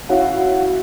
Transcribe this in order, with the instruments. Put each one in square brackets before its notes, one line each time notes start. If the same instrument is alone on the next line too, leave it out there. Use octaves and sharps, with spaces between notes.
[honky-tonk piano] C#4 E4 F#4 [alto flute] F5